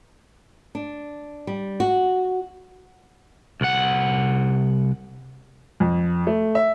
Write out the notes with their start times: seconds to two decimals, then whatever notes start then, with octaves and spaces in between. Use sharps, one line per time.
0.75 D4
1.47 G3
1.80 F#4
3.61 C2 F#5
5.80 F2
6.27 A3
6.55 E5